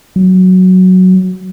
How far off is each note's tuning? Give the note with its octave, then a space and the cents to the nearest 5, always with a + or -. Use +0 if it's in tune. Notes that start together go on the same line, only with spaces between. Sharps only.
F#3 +0